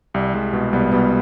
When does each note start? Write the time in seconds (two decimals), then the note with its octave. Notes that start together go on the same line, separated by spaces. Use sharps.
0.14 C2 G3
0.34 C2 G#3
0.53 B2 G#3
0.73 C2 G3 B3
0.92 B2 G3 B3